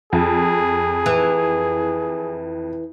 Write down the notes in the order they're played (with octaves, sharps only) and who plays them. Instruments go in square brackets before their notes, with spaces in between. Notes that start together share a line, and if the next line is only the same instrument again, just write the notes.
[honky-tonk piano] F2 [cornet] G#4
[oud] E3